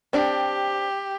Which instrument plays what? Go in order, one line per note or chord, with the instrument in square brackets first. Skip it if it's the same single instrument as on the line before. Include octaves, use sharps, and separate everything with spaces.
[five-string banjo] C4 D4 [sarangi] G4